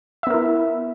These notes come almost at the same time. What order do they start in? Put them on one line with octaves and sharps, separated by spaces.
E5 B3 A#4 E4